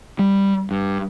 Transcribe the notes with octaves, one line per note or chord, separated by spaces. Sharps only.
G3
G2